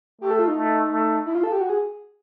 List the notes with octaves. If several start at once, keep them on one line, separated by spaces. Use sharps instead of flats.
A3 G4
A4
F4
D#4
A3
A3
E4
F4
A4
G4
F#4
G#4